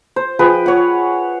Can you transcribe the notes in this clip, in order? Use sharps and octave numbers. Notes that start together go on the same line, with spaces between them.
C5
F3 G#4 B4 G5
C#5 F#5